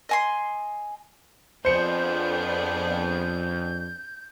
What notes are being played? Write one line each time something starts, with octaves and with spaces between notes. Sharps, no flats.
D#5 G#5 C6
F2 B3 D4 G#4 C5 G6 C#7